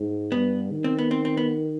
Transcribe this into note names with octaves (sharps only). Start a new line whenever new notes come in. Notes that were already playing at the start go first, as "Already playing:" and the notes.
Already playing: G#2
G2 B3
D#3
C4
B3
C4
C4
B3